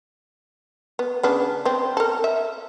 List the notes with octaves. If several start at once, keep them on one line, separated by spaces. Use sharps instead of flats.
B3
C#3 B3 D4
B3 C4
A4 A#4
E5